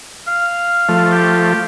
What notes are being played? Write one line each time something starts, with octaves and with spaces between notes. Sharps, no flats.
F5
F3 A3
G4